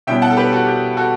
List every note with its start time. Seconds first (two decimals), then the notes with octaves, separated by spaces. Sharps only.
0.07 B2 G3 C#4 E4 E5 G5
0.22 F#5 A5
0.30 A4
0.37 G4 B4
0.52 F#4 A4
0.66 G4
0.97 F#4 A4